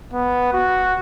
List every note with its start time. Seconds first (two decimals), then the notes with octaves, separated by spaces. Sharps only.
0.14 B3
0.53 F#4